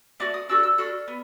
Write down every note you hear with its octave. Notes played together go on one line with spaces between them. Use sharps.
A3 D4 F#4 D6
D#6
D4 F#4 A4 E6
E6
D4 F#4 A4 F6
B3